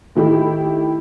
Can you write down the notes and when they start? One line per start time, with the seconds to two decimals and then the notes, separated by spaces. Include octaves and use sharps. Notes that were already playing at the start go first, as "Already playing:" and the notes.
0.15 A2 D#3 E4 G4